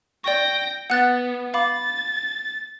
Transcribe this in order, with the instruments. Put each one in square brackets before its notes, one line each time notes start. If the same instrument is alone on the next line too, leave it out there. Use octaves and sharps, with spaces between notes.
[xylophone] D5 C#6 [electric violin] G5 A#6
[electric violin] B3 [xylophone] F#5 F#6 A6
[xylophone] F5 B5 D6 [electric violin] A6